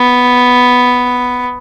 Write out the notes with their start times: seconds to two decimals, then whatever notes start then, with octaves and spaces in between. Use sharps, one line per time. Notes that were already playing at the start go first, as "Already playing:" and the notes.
Already playing: B3